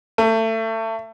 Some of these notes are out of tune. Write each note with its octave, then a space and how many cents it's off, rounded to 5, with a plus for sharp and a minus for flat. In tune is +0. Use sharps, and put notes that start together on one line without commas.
A3 +25